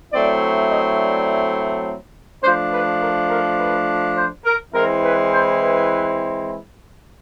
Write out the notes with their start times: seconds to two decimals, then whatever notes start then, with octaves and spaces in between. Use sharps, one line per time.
0.13 F#3 A3 C4 E4 D5
0.70 D#5
0.99 D5
2.43 F3 A3 D4 C5
2.72 B4
3.01 A#4
3.29 A#4
3.58 B4
4.16 C5
4.45 A#4
4.73 E3 G#3 C4 E4 A#4
5.03 B4
5.31 C5
5.61 B4